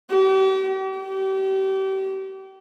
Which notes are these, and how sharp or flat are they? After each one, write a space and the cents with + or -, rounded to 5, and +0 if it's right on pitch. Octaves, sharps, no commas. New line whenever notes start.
G4 -40
G4 -35